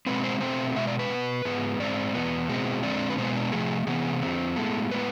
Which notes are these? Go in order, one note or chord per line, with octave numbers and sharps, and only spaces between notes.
B2 G#3 C4 B4
C5
B2 A3 C4 C5
B2 G#3 E5
D5
B4
B2 B3
G#2 G#3 B3
G#2 G#3 C4 D5
E2 B2 B3
B2 G#3 C4
F2 D3 G#3 C4 D5
B4
B2 G#3 B3 C5
D4
C3 F3 A3 G#4
C3 E3 B3 G#4
F2 D3 G#3 C4
A2 G#3 B3 A4
A2 G#3 B3 B4